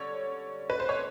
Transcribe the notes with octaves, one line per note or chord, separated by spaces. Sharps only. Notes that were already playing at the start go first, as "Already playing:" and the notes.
Already playing: D3 G3 C#5
B4
C5
C#5